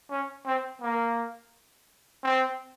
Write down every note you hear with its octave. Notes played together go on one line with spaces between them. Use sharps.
C#4
C4
A#3
C4